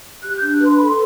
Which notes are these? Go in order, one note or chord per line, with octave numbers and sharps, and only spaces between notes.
G4 F#6
G6
D4
F#6
B4
C6
A4 B5
C6